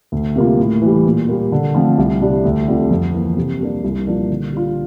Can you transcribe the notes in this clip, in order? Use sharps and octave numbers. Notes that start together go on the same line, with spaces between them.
D2
C3 G3 A#3 F4
A2
E3 G3
A#2
G3 A#3
D3
F3 A3 C4 F4
C2
C3 G3 D4
D2
D3 G3 C4 F4
F2
E3 A#3
C3
G3 A#3 D4
C2
A#2 F3 A#3 D4
D3
G3 D4 F4